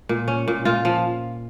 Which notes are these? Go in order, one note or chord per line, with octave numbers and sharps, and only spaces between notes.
A#2
C#4
A#2
A#2 F4
F3